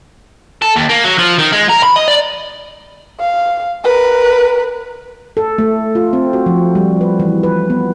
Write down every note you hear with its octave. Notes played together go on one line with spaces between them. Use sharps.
A4
D#2
A#3
F#3
F3
D#3
G#3
A#4
B5
D#5
D5
F5
A#4 B4
A4
A3
F4
C4
F#4
F3
G3
B4
E3
B4
B3